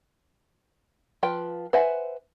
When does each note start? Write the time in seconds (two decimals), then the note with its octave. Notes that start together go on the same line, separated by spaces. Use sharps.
1.23 F3 F4 B4 G5
1.73 B4 C5 E5 F#5 G#5